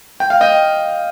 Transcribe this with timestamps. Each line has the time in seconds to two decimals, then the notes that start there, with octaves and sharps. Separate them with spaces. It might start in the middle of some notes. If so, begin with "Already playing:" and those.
0.20 G5
0.30 F5
0.41 D#5 G5